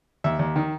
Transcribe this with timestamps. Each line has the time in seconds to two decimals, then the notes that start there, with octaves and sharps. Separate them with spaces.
0.24 D#2 E5
0.39 D#2
0.56 D#3